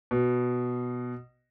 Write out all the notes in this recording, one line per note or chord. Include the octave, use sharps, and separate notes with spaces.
B2